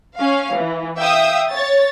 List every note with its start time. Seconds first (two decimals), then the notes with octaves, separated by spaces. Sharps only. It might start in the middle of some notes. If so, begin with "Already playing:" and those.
0.17 C#4 F5
0.56 E3
0.98 E5 F5 G5 D#6 E6
1.52 C#5 A6